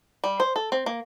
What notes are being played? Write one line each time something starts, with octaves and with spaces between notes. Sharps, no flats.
G3
C5
A4
C4
A#3